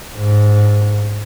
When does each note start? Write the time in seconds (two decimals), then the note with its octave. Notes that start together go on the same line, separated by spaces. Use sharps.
0.16 G#2